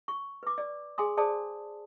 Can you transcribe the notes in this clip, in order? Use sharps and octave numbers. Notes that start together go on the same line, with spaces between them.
C#6
B4 D6
D5
G#4 G#5 C6 D#6
G#4 C5 D5 A5 D#6